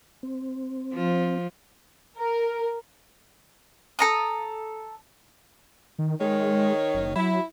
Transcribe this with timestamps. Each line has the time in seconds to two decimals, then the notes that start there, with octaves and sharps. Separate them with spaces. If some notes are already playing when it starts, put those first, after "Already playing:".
0.23 C4
0.94 F3
2.18 A#4
3.99 A4 A#5 D#6
5.98 D#3
6.20 D#3 G#3 C#5
6.94 F#1
7.16 F#3 E4